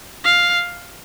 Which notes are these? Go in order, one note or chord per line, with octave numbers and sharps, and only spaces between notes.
F5